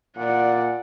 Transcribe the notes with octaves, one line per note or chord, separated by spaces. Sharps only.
A#2 D5 F#5